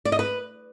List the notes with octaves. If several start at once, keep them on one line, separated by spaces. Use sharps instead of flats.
D5
D#5
B4